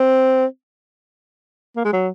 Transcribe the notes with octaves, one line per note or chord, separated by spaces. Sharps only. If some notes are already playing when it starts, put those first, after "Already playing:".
Already playing: C4
A#3
G#3
F#3